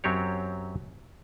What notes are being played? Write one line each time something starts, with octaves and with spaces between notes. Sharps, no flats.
F#2 F#3 C4 G4 C#5